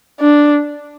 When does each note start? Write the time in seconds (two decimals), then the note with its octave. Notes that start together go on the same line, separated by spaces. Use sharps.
0.20 D4